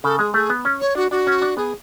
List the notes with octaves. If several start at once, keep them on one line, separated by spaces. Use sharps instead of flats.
C#3 A4
G#3 G#4
A3 G#4
B3
C#4
C#5
D4 F#4
D4 F#4
C#4
D4
B3 G#4